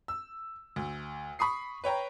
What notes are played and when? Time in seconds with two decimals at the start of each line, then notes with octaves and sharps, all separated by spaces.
0.08 E6
0.76 D2
1.39 B5 C#6 D#6 C7
1.84 B4 C#5 G5 A#5